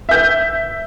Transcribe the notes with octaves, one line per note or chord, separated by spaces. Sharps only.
E5 G6